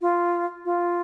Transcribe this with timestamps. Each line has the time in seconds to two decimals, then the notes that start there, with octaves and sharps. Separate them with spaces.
0.02 F4
0.65 F4